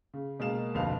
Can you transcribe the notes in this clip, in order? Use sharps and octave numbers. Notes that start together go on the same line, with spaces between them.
C#3
B2 G#3 A#3 A#4 F5 E7
F1 D2 B2 B3 F5 F7